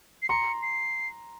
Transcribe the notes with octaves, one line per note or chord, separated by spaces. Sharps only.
C7
A#5 C6 C#7
C7